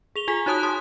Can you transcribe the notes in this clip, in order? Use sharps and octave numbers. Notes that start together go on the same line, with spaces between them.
G#4 F7 G7
F4 G#4 G#5 B6
D#4 F#4 C#5 A5 D#6 F#6
A5 C6 D#6